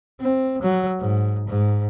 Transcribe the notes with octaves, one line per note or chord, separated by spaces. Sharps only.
C4
F#3
G#2
G#2